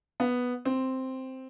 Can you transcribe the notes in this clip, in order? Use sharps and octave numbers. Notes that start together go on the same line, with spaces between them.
B3
C4